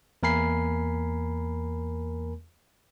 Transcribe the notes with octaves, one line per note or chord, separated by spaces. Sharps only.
E2 A#3 A#4 G#5 B5 C7